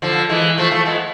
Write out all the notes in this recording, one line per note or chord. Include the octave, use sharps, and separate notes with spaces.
D3 F3
E3 G#3
F3 A3
F3 A3
G#3 B3